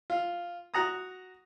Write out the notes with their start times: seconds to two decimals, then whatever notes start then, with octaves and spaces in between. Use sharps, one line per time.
0.10 F4
0.74 F#4 F#5 A#5 D#6